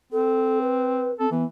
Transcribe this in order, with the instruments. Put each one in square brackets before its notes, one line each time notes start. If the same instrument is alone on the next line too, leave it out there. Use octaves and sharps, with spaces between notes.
[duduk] C4 [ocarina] A4
[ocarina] B4
[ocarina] C4 [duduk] A4
[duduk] E3 [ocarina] B3